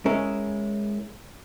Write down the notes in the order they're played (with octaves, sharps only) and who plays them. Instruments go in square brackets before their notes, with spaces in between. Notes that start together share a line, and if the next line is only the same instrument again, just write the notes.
[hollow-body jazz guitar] G#3 C#4 E4 A#4